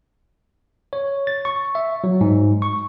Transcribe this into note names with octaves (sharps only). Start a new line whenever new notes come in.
C#5
A6
C#6
E5
F#3
G#2
C#6